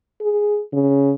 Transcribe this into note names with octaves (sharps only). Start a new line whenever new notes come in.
G#4
C#3